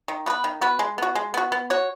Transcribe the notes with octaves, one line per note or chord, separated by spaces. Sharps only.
D#3
B3 F#4 B4
D#3
B3 F#4 B4
G#3
B3 F#4
G#3
B3 F#4
B3
F#4 C#5